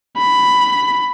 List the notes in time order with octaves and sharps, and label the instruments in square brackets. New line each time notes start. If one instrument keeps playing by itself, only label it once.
[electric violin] B5